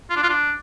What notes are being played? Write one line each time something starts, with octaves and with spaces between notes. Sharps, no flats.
F4
D4
F4
D4